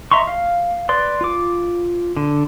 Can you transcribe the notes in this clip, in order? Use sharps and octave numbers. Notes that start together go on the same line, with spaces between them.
D#5 E5 A#5 C6 C#6
F5
B4 D5 C6
F4 D6
D3